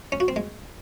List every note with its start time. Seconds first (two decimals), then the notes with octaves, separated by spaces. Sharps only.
0.12 C#4
0.20 F#4
0.28 C4
0.36 G#3